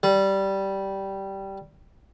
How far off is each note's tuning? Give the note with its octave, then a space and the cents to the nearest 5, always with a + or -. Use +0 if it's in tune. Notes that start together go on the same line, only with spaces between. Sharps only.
G3 -10